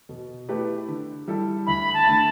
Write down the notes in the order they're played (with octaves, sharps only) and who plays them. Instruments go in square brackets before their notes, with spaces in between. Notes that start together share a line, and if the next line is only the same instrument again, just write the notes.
[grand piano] B2
A3 E4 G4 B4
D3
G3 E4 A4
[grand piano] D2 [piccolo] B5
[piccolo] A5
[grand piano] D3 A3